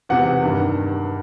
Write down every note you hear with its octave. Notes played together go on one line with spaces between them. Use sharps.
E2 C3 E3 F#5
G2 D#3